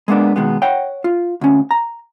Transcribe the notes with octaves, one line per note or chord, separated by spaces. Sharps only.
G#3 A#3 B3 D4
B2 D#3 G#3 B3
C#5 F#5 G5
F4
D2 C#4
A#5